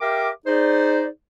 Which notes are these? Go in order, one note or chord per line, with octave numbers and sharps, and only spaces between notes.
G4 A#4 E5 F5 G5 D6
D#4 G#4 C5 D5